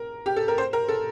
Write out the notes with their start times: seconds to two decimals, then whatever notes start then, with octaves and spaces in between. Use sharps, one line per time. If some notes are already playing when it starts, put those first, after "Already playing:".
Already playing: A#4
0.26 G4
0.36 A4
0.48 A#4
0.58 C5
0.73 A#4
0.88 A4